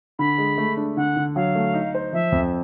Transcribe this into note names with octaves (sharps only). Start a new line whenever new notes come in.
D3 B5
G#3
A3
D4
D3 F#5
D3
F#3 F5
A3
D#4
C5
F3 E5
F2